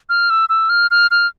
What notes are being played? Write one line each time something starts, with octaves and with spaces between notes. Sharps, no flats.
F6
E6
E6
F6
F6
F6